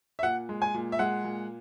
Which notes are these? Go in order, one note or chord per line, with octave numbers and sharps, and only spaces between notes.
E5
A#2 F#5
G#3
G#5
A#2
E5
G#3 F#5
A#2